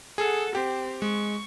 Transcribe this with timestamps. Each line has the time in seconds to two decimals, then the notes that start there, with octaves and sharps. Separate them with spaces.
0.18 G#4 A4 F#5
0.55 C4 G4
1.02 G#3 C#6